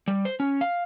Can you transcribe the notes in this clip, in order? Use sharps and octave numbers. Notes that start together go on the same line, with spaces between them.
G3
C5
C#4
F5